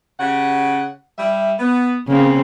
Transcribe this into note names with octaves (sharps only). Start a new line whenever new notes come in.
C#3 G4 F#5
G3 E5
B3
C#3 A#3 C4